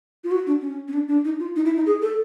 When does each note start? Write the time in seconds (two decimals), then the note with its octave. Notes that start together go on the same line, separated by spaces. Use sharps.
0.24 F4
0.31 F#4
0.47 D4
0.61 C#4
0.88 C#4
0.93 D4
1.08 D4
1.25 D#4
1.39 F4
1.56 D#4
1.65 E4
1.76 D#4
1.86 G#4
2.02 A4